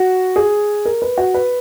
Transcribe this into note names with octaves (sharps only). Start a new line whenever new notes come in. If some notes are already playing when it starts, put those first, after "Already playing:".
Already playing: F#4
G#4
A#4
B4
F#4
B4